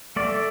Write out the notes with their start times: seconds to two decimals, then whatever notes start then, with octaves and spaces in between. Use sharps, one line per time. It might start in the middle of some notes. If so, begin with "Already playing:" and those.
0.16 A3 D5